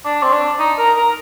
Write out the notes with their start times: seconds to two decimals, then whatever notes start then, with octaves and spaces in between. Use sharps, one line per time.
0.05 D4
0.22 C4
0.33 D4
0.59 D#4
0.78 A#4
0.96 A#4